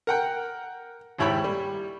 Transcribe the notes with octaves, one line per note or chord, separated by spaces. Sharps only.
A#4 F#5 G5
D#2 G#2 E4 C#5 G5 B5
G3